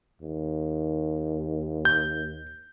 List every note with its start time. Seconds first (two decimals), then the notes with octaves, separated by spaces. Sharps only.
0.21 D#2
1.85 G6